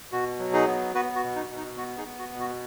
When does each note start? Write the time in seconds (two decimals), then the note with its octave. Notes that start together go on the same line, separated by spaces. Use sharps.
0.12 B2 F#4
0.39 F#3
0.53 D#4 G#4
0.67 B3
0.95 B3 F#4 B4
1.15 F#4
1.22 B2
1.36 D#4
1.50 B2
1.57 D#4
1.77 B3 F#4
1.98 D#4 G#4
2.05 B3
2.19 F#4
2.33 B2
2.40 F#4